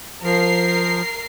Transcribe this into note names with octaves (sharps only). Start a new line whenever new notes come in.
F3 A#4 C7